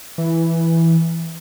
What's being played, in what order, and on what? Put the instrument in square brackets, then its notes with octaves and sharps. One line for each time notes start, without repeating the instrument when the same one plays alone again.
[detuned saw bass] E3